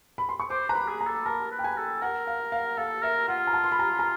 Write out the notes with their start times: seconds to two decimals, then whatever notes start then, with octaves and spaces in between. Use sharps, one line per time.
0.18 B5
0.29 C6
0.40 C#6
0.50 C5 D6
0.69 B4 A#5
0.75 B5
0.88 G#4
1.01 A#5
1.07 A4
1.26 A#4 A5
1.51 B4
1.59 G5
1.64 G#5
1.77 A4
2.02 A#4 F#5
2.27 F5
2.52 F5
2.78 A4 F5
3.03 A#4 E5
3.28 F4 F#5
3.47 A#5
3.53 A5
3.64 C6
3.72 B5
3.79 A#5
3.99 A#5